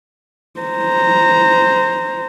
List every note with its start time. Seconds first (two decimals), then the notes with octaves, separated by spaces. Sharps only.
0.60 C5 A#5